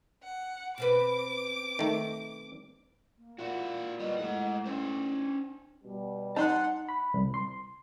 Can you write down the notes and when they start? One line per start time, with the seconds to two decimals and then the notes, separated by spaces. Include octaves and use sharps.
0.23 F#5
0.78 B2 C4 B4 D6
1.79 D#3 A3
3.18 A#3
3.39 A#2 E4 F#4
4.00 G3 B3 D#5
4.18 A2 G#3 F#5
4.66 C#4 D4 C5
5.83 B2 G3
6.36 D#4 F#5 A5 C6 F#6
6.89 B5
7.14 C2
7.34 C6